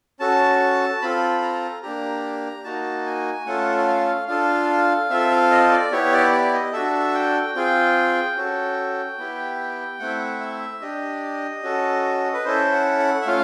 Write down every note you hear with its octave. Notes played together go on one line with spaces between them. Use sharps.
C#4 F#4 A4 A5
C4 F4 A4 B5
A#5
A#3 D4 G4 A#5
A#3 D#4 F#4 A5
G#5
A3 C#4 F4 A4 F#5
F#5
F5
D4 F4 A4 F5
C4 F4 A4 E5
F5
D#5
D5
B3 E4 G4 C#5
D5
D5
D#5
D4 F#4 A4 E5
G5
C4 F4 G#4 G5
C#4 F#4 A4
B3 E4 G4
A3 C4 E4 F#5
E5
D4 G4 D#5
C#4 F#4 A4
B4
C#4 E4 A4 C5
F#5
F#5
E5
A3 C#4 F4 F5